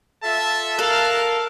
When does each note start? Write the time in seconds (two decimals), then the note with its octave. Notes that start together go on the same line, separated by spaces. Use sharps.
0.24 F4 A4 E5 A5
0.79 A4 A#4 F5 F#6